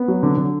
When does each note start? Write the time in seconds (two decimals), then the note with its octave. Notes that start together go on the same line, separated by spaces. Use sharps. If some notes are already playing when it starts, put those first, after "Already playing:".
Already playing: B3
0.08 F#3
0.23 D3
0.37 D3